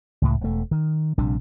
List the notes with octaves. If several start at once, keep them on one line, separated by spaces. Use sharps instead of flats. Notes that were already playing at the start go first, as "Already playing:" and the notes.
C#2 A2
E1 A3
D#3
A#1 C3 G3 D4